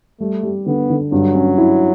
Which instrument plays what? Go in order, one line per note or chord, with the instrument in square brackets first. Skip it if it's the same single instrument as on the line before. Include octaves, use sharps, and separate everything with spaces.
[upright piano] G3 [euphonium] A3
[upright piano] G3
[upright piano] D3 [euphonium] B3
[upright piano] D3
[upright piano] G2 [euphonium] F#3
[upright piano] C#4
E4